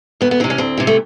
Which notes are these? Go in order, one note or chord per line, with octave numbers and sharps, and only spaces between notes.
D2 B3
B3
C3 E3 C4
C#4
D2 C4
C3 E3
A3